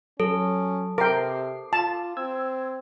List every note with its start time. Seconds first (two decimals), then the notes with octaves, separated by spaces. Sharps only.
0.20 F#3 C#4 A4
0.98 C3 A#4 G5 D6 C7
1.73 F4 A5
2.17 C4 E6 G#6